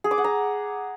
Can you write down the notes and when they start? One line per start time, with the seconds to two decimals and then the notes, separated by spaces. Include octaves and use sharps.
0.04 G#4
0.11 D6
0.18 F#5
0.24 A#5